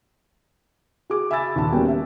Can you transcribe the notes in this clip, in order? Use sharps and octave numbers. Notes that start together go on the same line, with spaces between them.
F#4 G#4 D6
E5 G#5 B5 E6 A6
D#2 A#2 D#3 A5
G3 A#3 B3 C#4 F#4 G5
E5